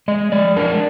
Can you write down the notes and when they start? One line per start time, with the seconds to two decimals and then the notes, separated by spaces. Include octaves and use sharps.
0.08 G#3 D#5
0.32 G#3 D5
0.56 D4 A#4